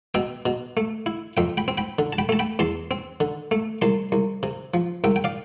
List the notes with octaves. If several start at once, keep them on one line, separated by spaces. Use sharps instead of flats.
B2 E5 G5
B2
A3
E4
F2 E5 G5
G5 B5
C4
G5 B5
D3
A5
G5 B5
A3 A5
G5 B5
E2 A5 C6
C4
D3
A3
C2 A5 C6
C2
C3
F3
C2 E5 G5
G5
D5 F5